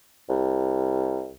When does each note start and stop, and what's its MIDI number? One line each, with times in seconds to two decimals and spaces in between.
0.29 1.31 36